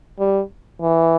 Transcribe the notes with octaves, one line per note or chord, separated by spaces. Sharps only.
G3
E3